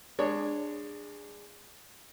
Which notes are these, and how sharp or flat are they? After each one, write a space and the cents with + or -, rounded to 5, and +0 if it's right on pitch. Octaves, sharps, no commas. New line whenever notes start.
G#3 -15 D4 +15 C#5 +0